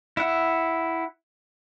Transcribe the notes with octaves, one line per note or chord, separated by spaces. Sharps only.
E4 E5 F#5